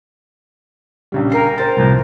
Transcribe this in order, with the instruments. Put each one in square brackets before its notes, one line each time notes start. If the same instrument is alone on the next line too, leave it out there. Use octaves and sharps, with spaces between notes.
[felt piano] A#1 C#3 G3
[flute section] A#4 G#5 [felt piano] G5 C7
[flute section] A#4 [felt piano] C5 A6
[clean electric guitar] C2 A2 F3